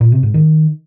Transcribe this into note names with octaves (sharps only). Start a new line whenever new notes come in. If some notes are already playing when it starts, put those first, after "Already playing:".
A#2
C3
G#2
D#3